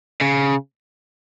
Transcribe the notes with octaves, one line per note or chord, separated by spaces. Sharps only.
C#3